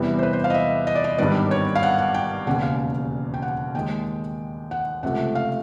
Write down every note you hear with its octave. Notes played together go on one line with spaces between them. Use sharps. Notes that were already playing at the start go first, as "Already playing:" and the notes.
Already playing: E2 C3 E3 G3 B3
C5
B4
C5
F5
D#5
E5
D#5
D5
D#5
G#1 G2 D#3 G3 B3 D5
C#5
F5
F#5
F#5
G5
E1 D#2 C#3 F#5
F5
G5
F#5
D#2 D#3 G#3 G5
F#5
C#2 C3 F3 A3 F#5
F5